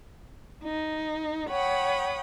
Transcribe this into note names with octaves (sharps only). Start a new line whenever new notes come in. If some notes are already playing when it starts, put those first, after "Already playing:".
D#4
C#5 F#5 G5 B5 D#6